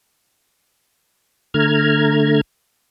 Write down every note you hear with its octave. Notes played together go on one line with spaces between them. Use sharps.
D3 A3 A#5 F6 G#6